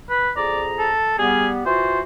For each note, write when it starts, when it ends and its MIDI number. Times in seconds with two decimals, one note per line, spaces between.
0.10 0.31 71
0.37 0.92 41
0.37 0.92 68
0.37 0.62 74
0.37 0.92 82
0.79 1.14 69
1.19 1.61 55
1.19 1.61 59
1.19 1.48 68
1.66 2.02 52
1.66 2.02 65
1.66 2.02 66
1.66 2.01 72